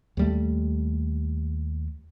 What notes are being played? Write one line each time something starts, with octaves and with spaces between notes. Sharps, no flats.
D#2 G3 A3